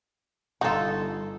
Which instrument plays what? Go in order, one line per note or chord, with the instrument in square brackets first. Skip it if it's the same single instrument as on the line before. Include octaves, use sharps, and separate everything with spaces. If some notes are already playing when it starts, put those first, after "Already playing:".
[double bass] G1 [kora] D#4 A4 [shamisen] F4 F#4